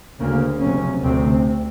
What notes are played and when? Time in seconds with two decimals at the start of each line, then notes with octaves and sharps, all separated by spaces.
0.19 D2 C#3 A#3
0.60 F#1 F2 C3 C#4
1.03 D2 C3 C4